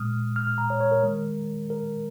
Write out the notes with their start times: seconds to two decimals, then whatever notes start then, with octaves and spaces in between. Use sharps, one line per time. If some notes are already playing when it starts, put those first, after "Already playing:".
Already playing: A#2 G#3 D#6 F6
0.36 F6
0.47 F6
0.58 A#5
0.70 C#5
0.80 C#5
0.91 A#4
1.04 D#3 G#3
1.70 A#4